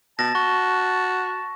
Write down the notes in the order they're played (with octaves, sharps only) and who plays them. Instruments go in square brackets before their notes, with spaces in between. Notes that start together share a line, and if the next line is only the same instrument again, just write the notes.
[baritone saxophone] B2 [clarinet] A5 [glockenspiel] A#6
[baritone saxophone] F#4 [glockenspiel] C#6